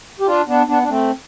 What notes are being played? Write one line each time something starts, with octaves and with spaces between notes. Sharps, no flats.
G4
D4 F4
B3 D4
B3 D4
D4
A3 C4